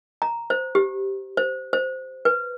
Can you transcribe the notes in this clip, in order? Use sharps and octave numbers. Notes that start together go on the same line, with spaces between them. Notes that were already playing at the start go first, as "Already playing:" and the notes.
A#5
C5
G4
C5
C5
B4